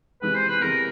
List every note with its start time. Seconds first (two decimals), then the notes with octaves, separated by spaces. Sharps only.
0.22 C3 E3 G#3 B3 B4
0.35 C5
0.48 B4
0.62 C3 E3 G#3 B3 A#4